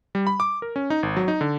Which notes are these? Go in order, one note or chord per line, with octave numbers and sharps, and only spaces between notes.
G3
B5
D6
A#4
C#4
D#4
G#1
F#3
D#4
D3